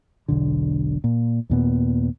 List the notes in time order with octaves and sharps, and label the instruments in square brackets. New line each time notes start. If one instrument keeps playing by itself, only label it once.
[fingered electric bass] E1 B1 D3
A#2
D#2 A#2 B3